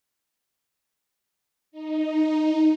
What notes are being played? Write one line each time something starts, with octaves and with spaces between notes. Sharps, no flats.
D#4